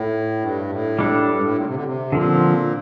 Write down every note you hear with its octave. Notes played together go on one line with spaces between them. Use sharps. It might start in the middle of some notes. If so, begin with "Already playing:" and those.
Already playing: A2
G2
A2
G3 D4 A4
G2
A2
A#2
C3
D3
C3
A#2 D3 F3 C4